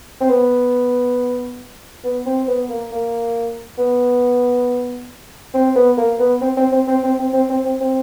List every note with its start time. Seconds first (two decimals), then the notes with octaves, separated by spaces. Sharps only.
0.21 C4
0.29 B3
2.04 B3
2.26 C4
2.47 B3
2.69 A#3
2.92 A#3
3.78 B3
5.54 C4
5.75 B3
5.97 A#3
6.19 B3
6.41 C4
6.57 C4
6.72 C4
6.87 C4
7.03 C4
7.18 C4
7.33 C4
7.49 C4
7.65 C4
7.80 C4